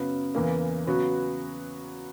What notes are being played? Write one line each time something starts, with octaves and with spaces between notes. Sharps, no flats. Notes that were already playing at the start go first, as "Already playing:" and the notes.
Already playing: F#2 C#3 F#3 B3
E2 C#3 E3 A#3
C#3 F#3 B3 F#4